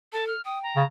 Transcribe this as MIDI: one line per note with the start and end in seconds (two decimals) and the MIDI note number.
0.13 0.32 69
0.13 0.27 81
0.27 0.41 89
0.45 0.79 79
0.45 0.59 87
0.63 0.86 82
0.76 0.84 49